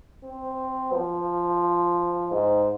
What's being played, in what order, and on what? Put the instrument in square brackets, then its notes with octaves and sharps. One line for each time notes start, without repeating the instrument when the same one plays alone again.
[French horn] C4
F3
G#2